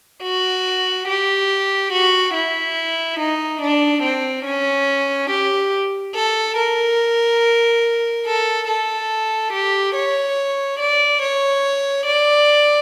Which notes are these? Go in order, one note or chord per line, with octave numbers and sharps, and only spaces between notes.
F#4
G4
F#4
E4
D#4
D4
C4
C#4
G4
A4
A#4
A4
A4
G4
C#5
D5
C#5
D5